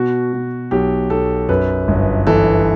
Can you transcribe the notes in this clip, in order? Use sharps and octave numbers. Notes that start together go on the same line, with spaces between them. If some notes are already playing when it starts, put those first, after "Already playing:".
Already playing: B2 F#4
B2
B1 G4
B1 A4
F#2 B4
G1
E3 A4